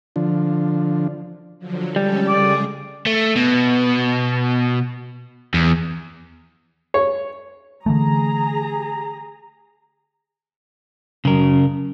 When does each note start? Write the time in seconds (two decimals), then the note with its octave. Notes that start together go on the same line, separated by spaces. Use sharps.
0.16 D3 F3
1.59 D3 F3 F#3
1.96 G3 G#3 C#4 A4
2.28 C#3 G#3 G#4 D5
3.06 A3
3.36 B2
5.54 E2
6.94 C#5
7.86 D3 E3 A3 G#4 A#5
11.25 F#2 C#3 A#4